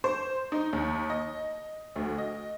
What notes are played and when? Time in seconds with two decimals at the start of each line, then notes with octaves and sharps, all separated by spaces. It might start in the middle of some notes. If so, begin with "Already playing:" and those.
0.04 C5
0.52 D#4
0.73 D#2
1.10 D#5
1.96 D2
2.18 D#5